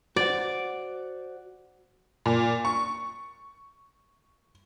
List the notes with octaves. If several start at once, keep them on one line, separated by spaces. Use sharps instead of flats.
F#4 C5 D5 F#5
A#2
C#6